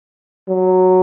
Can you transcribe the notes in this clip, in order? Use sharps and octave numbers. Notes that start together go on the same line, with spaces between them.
F#3